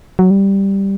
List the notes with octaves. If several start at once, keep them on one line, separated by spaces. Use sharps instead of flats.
F#3
G3